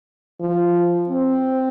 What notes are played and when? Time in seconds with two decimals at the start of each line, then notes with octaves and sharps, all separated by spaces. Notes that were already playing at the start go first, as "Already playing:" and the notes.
0.40 F3
1.09 C4